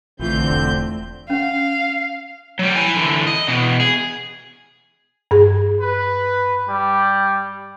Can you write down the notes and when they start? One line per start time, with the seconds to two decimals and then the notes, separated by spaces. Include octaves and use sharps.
0.20 A#1 D3 E3 A3 C4 F4 G6
0.50 E1 A3
1.30 C#4 F5 F#5
2.59 F#3 G3
2.76 E4 G#5
2.96 D3 E3
3.27 D#5
3.48 B2 E3
3.80 G#4
5.31 G2 G#4
5.81 B4
6.69 G3